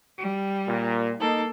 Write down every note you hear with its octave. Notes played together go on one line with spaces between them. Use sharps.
G3
A#2
A#3 D#4 A4